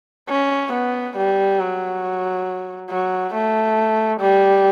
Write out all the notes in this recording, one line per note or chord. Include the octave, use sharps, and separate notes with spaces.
C#4
B3
G3
F#3
F#3
A3
G3